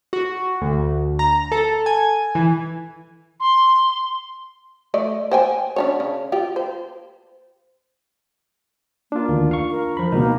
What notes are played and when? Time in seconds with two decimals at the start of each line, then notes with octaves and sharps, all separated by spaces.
0.13 F#4
0.61 D2
1.19 A#5
1.52 A4
1.86 G#5
2.35 E3
3.40 C6
4.94 A3 D5 D#5
5.31 C5 G5 G#5
5.76 C#4 D4 C#5
6.00 C#3
6.32 F4 G4
6.56 C5
9.12 A#3 D4 F4
9.29 D2 D#3
9.51 F5 C#6
9.71 A#4
9.97 F3 B5
10.12 C#2 B2 A#3 D#4